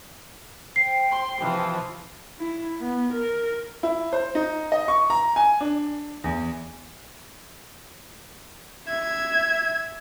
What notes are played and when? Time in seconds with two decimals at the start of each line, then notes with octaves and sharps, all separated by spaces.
0.76 C5 G5 C7
1.11 C6
1.40 C3 E3 F3
2.39 E4
2.79 B3
3.13 A#4
3.83 E4
4.13 C5
4.35 D#4
4.72 D#5
4.88 C#6
5.10 A#5
5.36 G#5
5.61 D4
6.24 E2
8.88 E5 G#6